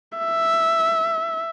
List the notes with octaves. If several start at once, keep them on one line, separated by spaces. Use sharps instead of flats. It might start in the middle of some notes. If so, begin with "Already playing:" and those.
E5